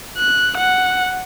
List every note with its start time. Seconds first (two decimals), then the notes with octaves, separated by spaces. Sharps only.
0.18 F#6
0.57 F#5